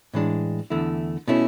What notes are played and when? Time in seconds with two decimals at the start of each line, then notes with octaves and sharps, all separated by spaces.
0.14 A2 E3 G#3 D4
0.70 E2 D3 A3 E4
1.28 B2 A3 C#4 E4